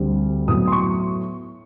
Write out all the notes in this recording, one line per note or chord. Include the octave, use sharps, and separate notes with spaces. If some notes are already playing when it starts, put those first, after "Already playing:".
Already playing: D2 D3 G3 C4
A2 F#3 B3 D#6
C6
C#6